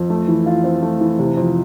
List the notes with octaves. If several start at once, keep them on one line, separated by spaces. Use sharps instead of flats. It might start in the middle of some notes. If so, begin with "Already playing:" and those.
Already playing: F2
A3
E3
F4
C4
A3
E3
C3
F2